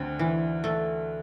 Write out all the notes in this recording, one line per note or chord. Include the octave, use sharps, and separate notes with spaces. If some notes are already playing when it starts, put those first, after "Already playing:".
Already playing: D2 D3 C4
E3
A3